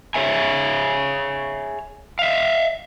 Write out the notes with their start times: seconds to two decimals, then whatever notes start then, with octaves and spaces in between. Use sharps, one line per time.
0.14 G#4 C#5 E5 G#5
2.19 E5 F5